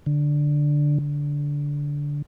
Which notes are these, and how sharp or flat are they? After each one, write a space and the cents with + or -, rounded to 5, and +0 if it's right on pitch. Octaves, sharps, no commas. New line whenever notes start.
D3 +0
D3 -15